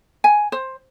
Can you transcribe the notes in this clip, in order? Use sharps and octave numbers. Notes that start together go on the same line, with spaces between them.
G#5
C5